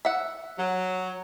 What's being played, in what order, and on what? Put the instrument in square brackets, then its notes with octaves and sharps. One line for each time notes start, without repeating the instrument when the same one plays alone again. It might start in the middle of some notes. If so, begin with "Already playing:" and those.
[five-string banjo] E5 F#5
[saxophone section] F#3